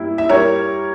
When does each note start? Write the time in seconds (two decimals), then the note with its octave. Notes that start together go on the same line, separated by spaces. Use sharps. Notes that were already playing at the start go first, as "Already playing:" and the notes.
Already playing: G3 A#3 E4
0.18 E5
0.29 G3 A#4 C#5